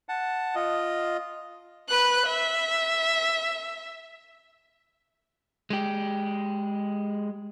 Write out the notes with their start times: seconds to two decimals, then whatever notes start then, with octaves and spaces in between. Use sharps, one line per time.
0.09 F#5 A5
0.55 F4 D#5
1.89 B4 F#6
2.26 E5
5.70 G#3 G4